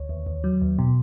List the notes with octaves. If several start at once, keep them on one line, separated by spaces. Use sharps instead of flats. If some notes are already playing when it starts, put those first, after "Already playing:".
Already playing: D2 C#5
D#2
D#2
F#3
D#2
B2